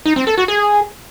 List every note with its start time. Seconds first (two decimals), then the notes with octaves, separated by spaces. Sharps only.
0.06 D#4
0.16 C4
0.27 A4
0.38 F#4
0.48 G#4